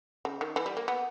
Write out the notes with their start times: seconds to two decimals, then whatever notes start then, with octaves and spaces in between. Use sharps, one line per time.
0.25 C#3
0.41 D#3
0.56 E3
0.66 G3
0.77 A#3
0.88 B3